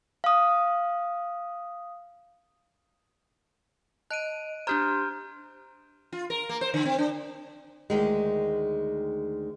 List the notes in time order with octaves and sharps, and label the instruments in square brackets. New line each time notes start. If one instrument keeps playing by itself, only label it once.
[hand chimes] F5 D#6
[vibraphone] D#5 [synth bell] A5 [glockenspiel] F#6 D7 D#7
[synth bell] D4 G4 C5 [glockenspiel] A#5 F6 G6 [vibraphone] C6
[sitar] F4
A#4
A#3
C5
D3
C4
D4
[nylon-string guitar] D2 D#3 G#3